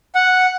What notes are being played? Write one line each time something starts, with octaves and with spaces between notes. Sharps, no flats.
F#5